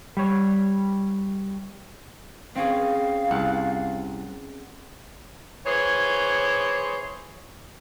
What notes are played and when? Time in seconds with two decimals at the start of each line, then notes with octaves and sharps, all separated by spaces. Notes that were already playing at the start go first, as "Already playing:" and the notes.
0.17 G3 C#5
2.56 C4 C#4 G#4 F5
3.31 C2 F#5 A6
5.66 E3 G#4 C5 C#5